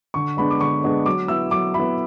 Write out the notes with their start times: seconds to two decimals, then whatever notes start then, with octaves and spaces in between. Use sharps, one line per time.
0.14 D3 C#6
0.37 G#3 B3 D4 B5
0.50 D6
0.60 D3 C#6
0.84 G#3 B3 D4
1.06 F#3 D6
1.28 B3 E4 E6
1.51 F#3 D6
1.74 E4 B5
1.79 B3